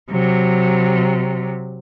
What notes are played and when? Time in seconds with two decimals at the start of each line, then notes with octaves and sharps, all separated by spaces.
0.11 C3 F#3